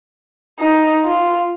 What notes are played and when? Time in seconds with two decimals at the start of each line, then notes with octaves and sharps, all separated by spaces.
0.60 D#4
1.05 F4